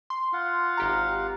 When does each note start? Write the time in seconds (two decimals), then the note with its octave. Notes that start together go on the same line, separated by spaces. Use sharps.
0.10 C6
0.33 F4 F5 F#5
0.77 G#1 G4 A#5